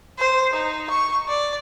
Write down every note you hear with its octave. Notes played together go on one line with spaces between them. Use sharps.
C5
D#4
C#6
D5